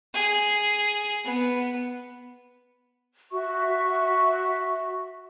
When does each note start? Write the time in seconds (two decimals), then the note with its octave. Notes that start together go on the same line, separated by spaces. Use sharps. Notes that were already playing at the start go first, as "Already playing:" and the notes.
0.14 G#4
1.24 B3
3.31 F#4 E5 C#6